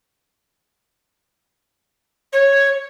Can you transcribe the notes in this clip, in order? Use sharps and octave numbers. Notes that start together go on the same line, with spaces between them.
C#5